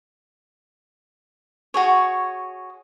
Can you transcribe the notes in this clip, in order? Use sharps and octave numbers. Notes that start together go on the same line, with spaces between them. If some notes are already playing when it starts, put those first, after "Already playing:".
F#4 G#4 C#5